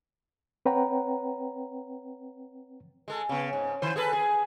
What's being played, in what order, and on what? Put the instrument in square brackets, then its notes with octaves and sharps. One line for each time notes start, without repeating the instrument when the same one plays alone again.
[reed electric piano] C4 B4 C#5 F#5 G5 A#5
[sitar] G#3 A4
C#3 B3
G#2
D#3 C5
G#4 A4 B4
G#4